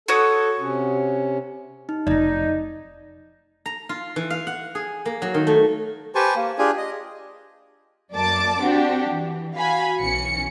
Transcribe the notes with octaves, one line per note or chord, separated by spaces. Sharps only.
F#4 A4 C#5 D#6
C3 C#4
D#4
F1 B1 D#4 D5 D#5
A#5
F4
E3
F5
F#5
G#4
A#3
F#3
D#3
A3
G4 B4 C5 G#5 A5 C#6
A#3
D4 F4 G4 G#4 G#5
D#5
F#2 A#3 D5 A5 D6
C4 D4 F#4 G4
E3
F#4 F5 G#5 B5
B1 E3 C#4 C#7